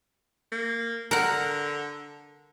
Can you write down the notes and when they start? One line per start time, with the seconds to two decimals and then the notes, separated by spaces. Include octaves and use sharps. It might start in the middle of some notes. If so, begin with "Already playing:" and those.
0.52 A#3
1.11 D3 A#4 F#5